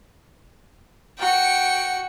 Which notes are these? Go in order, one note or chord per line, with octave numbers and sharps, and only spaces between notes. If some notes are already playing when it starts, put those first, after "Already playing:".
F#4 G5 C#7